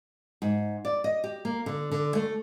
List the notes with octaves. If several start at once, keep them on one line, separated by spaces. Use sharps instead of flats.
G#2
D5
D#5
G4
A#3
D3
D3
A3